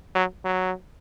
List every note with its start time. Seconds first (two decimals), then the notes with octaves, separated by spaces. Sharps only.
0.15 F#3
0.45 F#3